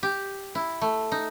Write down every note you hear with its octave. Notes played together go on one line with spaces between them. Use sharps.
G4
E4
A3
D#4